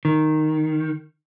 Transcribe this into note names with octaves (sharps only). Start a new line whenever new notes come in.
D#3